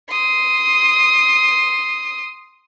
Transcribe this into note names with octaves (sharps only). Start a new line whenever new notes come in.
C6 D#6